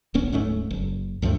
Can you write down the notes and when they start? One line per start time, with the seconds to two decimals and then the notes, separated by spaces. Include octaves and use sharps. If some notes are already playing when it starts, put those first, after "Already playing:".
0.14 D1 A1 B3 C#4
0.32 D1 G#2 A3 C#4
0.71 F#1
1.22 D2 G2 F3 A3